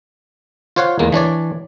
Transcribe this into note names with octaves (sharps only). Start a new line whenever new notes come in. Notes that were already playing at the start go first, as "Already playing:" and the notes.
F4 C5 C#5 F5 F#5
E2 G#3 A#3
E3 D4 C#5 D5